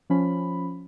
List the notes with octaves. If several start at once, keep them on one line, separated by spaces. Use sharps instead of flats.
F3 C#4 B5